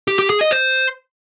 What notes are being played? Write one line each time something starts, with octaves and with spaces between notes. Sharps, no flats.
G4
G4
G#4
D#5
C5